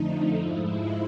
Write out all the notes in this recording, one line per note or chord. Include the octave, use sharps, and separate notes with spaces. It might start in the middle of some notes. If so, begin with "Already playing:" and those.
Already playing: F2 D3 F3 A3 D#4
G#2 F3 G#3 E4